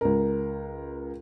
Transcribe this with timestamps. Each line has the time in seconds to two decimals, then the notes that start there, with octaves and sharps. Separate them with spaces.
0.01 C#2 A#4